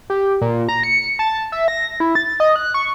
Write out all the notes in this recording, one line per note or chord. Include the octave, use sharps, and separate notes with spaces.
G4
A#2
A#5
C#7
A5
E5
A#6
E4
A6
D#5
F#6
C#6